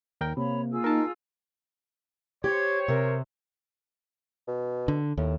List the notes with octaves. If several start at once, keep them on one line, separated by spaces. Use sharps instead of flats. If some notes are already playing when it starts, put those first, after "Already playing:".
D#2 A#4 G5
C3 A#3 C#5 B5
F4 G#4 E6
D#4 A#4 A5
G4 C5 C#5 G#6
C3 A#4
B2
D3
D#2 A2